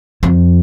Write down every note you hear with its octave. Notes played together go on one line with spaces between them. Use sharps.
F2